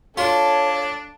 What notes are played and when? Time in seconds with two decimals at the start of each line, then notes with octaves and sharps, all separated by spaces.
0.17 D4 F4 A4 C#5